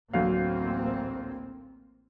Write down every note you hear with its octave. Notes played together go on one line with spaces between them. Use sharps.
A1 D2 F#3 A#3 C4 F5